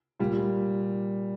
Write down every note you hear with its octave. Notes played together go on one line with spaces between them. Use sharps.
A#2 G3